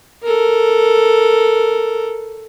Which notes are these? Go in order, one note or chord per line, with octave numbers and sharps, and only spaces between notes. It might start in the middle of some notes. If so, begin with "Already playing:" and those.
A4 A#4